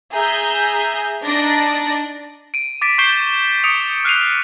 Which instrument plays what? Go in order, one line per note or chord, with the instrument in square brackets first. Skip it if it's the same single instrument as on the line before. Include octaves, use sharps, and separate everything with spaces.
[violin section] G#4 E5 A#5 G6
D4 D#4 D5 A#6
[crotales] D7 D#7
D6 A6 B6 D7
C#6 G6 C7 D7 E7 G7
D#6 C#7 D7 F7
F6 F#6 C7 D#7 F7